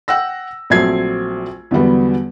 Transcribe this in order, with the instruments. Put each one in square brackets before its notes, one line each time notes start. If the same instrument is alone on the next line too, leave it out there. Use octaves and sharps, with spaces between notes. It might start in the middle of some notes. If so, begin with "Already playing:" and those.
[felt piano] F#5 G5 E6 A#6
A#1 F#3 A3 C4 G#6 C7
E2 D3 F#3 G3 B3